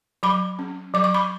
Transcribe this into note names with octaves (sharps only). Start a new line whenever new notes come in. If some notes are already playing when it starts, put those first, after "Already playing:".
F#3 B5 D6
C#4
F#3 D6
C#6
B5 D6